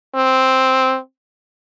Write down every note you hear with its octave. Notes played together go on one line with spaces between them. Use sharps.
C4